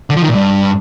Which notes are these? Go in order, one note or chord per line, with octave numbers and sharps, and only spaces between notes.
D3
F3
D#3
A#2
G2